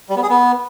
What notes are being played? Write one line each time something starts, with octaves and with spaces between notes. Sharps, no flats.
G3
B3
G#4
B3